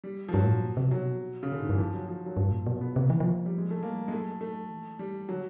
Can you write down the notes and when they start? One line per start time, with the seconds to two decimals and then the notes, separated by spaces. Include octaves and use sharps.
0.04 G3
0.28 F3
0.33 G2 F#3
0.43 A2
0.53 A#2
0.77 C3
0.91 B2 F#3
1.43 C#3
1.50 A#2 D3
1.59 G#2 D#3
1.69 G2 E3
1.78 F3
1.94 F#3
2.08 F3
2.26 F#3
2.37 G2 F3
2.51 A#2
2.66 B2 F#3
2.81 B3
2.95 C3 A#3
3.10 E3
3.20 E3
3.24 F3
3.45 G3
3.58 G#3
3.71 A3
3.83 G3 A#3
4.08 G#3
4.12 F#3 A3
4.41 A3
4.70 E3
4.99 G3
5.29 D3 F#3